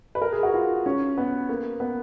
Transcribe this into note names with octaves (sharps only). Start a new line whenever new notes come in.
B4
A#4
G#4
F#4
F4
C#4
B3
A#3
B3